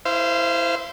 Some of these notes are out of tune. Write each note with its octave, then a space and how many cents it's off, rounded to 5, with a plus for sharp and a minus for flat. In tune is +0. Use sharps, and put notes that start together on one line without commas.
E4 +0 C5 -15 F5 -35